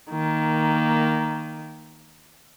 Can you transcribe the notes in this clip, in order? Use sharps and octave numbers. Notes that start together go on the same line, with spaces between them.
D#3 A#3